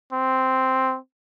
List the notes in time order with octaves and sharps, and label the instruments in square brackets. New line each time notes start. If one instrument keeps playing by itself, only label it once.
[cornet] C4